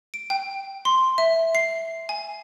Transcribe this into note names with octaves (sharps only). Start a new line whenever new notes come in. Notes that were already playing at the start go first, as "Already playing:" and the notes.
D7
G5
C6
E5
C7
G#5